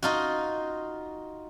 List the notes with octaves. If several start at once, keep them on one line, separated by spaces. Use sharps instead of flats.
D#4 F4 F#4